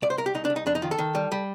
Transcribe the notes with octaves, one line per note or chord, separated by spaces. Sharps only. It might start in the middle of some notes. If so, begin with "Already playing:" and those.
C2 D5
C5
C2 A#4
G4
C2 D#4
D4
C2
D#4
F2 D4
D#4
D#3 F4
A4
D#3
G3
G3